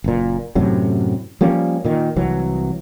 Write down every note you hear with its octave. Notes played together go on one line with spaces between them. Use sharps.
F#1 A#2
F#2 A2 C3 F#3
F3 G3 A#3 C#4
A#2 D#3
C2 E3 F#3